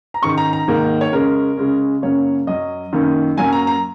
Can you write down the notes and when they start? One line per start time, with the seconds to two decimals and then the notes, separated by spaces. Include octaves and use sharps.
0.14 A#5
0.22 G#2 D#3 G#3 C#4 C#6
0.38 A#5
0.53 A#5
0.68 G#2 D#3 A#3
1.01 C#5
1.12 C#3 G#3 C#4 A#4
1.57 C#3 G#3 C#4
2.02 F#2 C#3 F#3 A#3 C#4 C#5
2.47 F#2 F#3 C#4 D#5
2.93 F#2 D#3 A#3 C#4
3.37 F#2 F#3 A#3 C#4 G#5
3.53 A#5
3.67 A#5